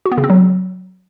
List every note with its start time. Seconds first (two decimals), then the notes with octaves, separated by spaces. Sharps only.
0.06 F#4
0.12 B3
0.18 C#3
0.24 C4
0.30 F#3